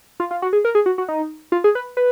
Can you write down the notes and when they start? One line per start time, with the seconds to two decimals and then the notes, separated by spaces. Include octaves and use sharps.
0.20 F4
0.31 F4
0.42 F#4
0.53 G#4
0.65 A#4
0.75 G#4
0.86 F#4
0.98 F#4
1.08 D#4
1.52 F4
1.64 G#4
1.75 B4
1.97 B4